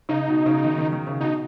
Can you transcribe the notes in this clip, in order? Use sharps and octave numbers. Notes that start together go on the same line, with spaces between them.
C#3 D#4
B2
C#3
D#3
D#3
D#3
C#3
B2 D#4